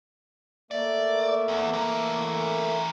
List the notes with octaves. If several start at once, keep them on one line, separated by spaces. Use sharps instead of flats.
A3 A#3 D5 E5
E2
E3 A#4